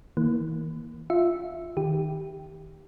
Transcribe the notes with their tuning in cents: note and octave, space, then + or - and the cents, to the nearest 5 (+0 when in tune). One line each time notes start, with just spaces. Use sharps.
E3 -45 A#3 +0
F4 +0 E5 +0
D#3 +0 G4 +0